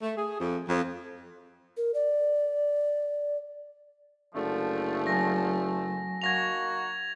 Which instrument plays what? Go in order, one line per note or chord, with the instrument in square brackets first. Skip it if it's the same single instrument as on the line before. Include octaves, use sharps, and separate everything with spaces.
[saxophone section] A3
G#4
F2
F2
[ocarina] A#4
D5
[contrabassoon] F#1 [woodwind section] D3 F3 A3
[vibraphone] F#3 G#5 A5 [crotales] A#6
[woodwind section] A#3 D#4 F#4 [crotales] G#6 A#6 F7